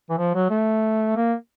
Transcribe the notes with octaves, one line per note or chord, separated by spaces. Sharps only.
E3
F3
F#3
A3
A#3